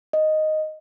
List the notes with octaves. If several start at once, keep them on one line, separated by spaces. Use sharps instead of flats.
D#5